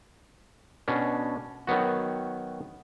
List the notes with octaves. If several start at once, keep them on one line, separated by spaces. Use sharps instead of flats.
B2 C#4 D4
D#3 F#3 B3 F#4